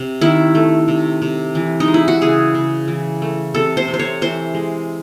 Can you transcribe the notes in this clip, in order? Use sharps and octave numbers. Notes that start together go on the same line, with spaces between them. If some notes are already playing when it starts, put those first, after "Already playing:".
Already playing: C3
D#3 E4
A3
C3
C3
E3
D#4
G#3
E4
F#4
C#3 G#4
C#3
E3
A3
C3 A4
C5
C3
C5
C#5
E3 C5
G#3